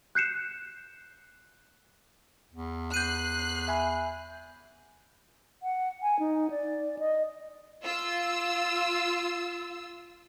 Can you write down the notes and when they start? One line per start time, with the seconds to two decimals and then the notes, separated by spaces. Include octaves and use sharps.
0.15 F#6 G6 C7 C#7 E7
2.53 E2
2.94 E2 F#6 G6 C7 D#7
3.68 E5 G#5 B5
5.63 F#5
6.02 G#5
6.19 D#4
6.51 D5
6.99 D#5
7.84 F4 E6